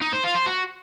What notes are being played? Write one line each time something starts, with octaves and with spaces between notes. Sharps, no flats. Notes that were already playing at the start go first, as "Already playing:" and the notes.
D#4
C5
F4
C5
F#4